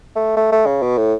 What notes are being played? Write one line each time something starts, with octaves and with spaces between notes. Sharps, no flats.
A3
A3
A3
C#3
B2
A2